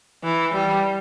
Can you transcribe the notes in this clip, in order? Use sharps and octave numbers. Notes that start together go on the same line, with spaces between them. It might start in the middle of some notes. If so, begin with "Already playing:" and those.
E3
G3